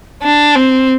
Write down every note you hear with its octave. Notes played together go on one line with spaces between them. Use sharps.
D4
C4